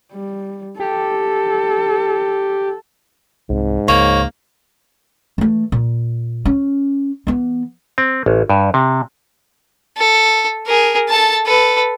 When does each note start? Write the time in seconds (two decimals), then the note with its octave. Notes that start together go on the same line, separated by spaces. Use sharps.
0.12 G3
0.80 G4 A4
3.50 C2 G#2 C4
3.88 C#2 C#3 A#3 C#5
5.38 E3 A3
5.72 A#2
6.45 C#4
7.27 E3 B3
7.98 C4
8.26 A1
8.50 G2
8.74 C3
9.97 A4
10.67 G#4 A#4
11.09 A4 A5
11.46 A4 B4